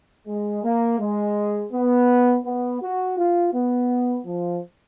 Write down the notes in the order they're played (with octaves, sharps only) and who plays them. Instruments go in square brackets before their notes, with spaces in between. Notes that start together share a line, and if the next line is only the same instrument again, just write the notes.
[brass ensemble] G#3
A#3
G#3
B3
B3
F#4
F4
B3
F3